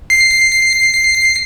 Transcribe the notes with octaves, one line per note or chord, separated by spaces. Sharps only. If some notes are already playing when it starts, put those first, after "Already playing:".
C7